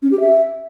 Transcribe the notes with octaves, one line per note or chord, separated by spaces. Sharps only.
C#4
G4
E5